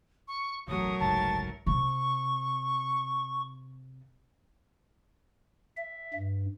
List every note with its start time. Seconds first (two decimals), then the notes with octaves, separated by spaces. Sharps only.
0.28 C#6
0.68 E1 A1 F#3 A3 A#4 D#6
1.00 F#1 C2 G#2 A5 A6
1.66 C3 C#6
5.77 E5
6.14 G2